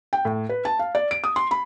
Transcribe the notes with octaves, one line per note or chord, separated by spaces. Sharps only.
G5
A2
B4
A5
F5
D5
D7
D#6
C6
B5